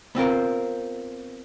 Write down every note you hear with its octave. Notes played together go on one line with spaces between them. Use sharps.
B3 C4 F4 A#4